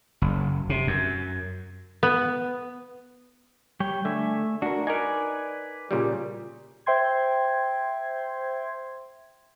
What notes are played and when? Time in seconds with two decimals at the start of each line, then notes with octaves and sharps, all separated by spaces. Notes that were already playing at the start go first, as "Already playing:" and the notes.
0.22 F#1
0.70 C3
0.87 F#2
2.03 B3
3.80 G3 C#5 G5
4.05 D3 A3 E5 G#5
4.62 D4 F#4 A#4
4.87 D#4 A#4 B4 D5 G#5
5.91 A#2 C#3 G3
6.86 C5 E5 G5 C6 G#6